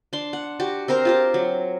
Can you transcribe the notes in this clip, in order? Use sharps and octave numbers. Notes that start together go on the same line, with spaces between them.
D4 C6
F#5
F#4 G4
C4 A#4 C5 A#5
F4 G4 A#4
F#3